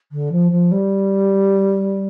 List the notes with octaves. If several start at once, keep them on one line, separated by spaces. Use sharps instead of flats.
D3
F3
F3
G3